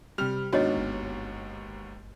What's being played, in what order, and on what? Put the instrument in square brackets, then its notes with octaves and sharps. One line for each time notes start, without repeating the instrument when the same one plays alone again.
[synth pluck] C3 C4 G4 [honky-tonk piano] G3 F6 F7
[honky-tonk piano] D#2 G#2 B3 [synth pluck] D4 D#4 [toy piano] F#4 C#5 D#5
[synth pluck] G1